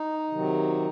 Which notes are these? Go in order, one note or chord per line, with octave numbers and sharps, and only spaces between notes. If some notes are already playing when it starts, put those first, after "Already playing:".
Already playing: D#4
C3 D#3 F#3